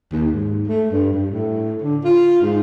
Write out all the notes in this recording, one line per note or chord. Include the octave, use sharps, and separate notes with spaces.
D#2
G#2
A3
G2
G2
A2
D3
F4
G#2